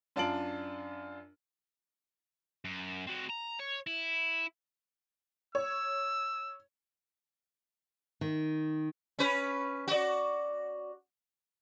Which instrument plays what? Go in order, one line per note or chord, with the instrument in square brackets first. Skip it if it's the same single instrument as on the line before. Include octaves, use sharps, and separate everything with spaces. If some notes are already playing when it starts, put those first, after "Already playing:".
[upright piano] F#2 D4 F4 A5 D7 F#7
[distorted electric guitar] F#2
C4 F#4
A#5
C#5
E4
[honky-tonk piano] C#5 [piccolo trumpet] E6
[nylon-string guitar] D#3
[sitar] C#4 B4
F#4 D5